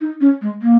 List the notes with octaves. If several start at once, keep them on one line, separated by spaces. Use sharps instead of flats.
D#4
C#4
G#3
A#3